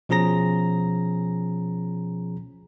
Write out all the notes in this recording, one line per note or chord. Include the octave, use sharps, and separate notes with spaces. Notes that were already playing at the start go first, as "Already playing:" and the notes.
B2 F3 C#4 G#4 A#5 A#6